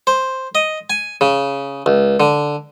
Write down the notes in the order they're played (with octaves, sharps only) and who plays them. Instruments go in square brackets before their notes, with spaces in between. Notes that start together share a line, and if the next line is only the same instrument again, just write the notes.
[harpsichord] C5
D#5
G#5
C#3
C#2
D3